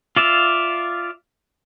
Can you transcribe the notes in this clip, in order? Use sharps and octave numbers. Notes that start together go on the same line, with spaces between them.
F4 D5 E5 F5